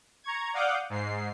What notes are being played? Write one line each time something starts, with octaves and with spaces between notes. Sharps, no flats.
A#5 C#6 G#6
D5 F5 F#5 D6 D#6 G6
G#2 C7